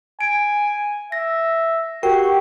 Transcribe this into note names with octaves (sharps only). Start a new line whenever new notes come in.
G#5 D7
E5 A#6
F#4 G4 A#4 G5